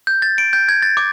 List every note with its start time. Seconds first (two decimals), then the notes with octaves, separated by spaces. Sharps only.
0.07 G6
0.22 A6
0.38 D7
0.53 G6
0.69 G#6
0.82 A6
0.97 D6